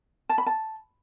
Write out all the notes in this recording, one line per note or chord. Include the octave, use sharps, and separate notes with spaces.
A5
B5
A5